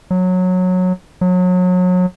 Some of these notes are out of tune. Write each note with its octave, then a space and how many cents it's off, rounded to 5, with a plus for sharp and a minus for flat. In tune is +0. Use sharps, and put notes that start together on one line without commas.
F#3 -15
F#3 -30